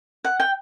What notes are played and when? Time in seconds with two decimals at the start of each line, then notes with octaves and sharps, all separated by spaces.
0.24 F#5
0.40 G5